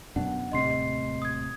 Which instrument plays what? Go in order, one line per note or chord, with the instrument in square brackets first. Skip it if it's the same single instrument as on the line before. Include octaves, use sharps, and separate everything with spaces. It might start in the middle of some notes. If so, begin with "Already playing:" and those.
[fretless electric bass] F#2 B2 D4 [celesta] F#5
[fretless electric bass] D#1 A2 C3 [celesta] D#5 C6 C7
[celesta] D#6 G#6